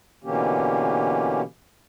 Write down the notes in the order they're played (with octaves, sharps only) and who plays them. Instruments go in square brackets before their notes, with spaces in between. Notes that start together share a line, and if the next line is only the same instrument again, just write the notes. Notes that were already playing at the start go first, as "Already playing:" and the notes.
[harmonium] B2 D3 E3 A#3 C#4 G4